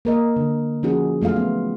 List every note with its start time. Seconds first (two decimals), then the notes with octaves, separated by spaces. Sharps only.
0.05 A#3 A#4 D#5
0.36 D3
0.83 F3 C#4 D#4 F#4 G#4
1.21 F#3 A3 F4 F5
1.36 B3